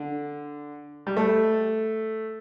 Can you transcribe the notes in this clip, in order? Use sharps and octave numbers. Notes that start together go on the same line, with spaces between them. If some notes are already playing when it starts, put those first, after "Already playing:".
Already playing: D3
G3
A3